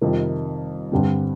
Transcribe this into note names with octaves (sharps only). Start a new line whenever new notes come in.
F2 C3 D#3 G3
G2 D3 G3 C4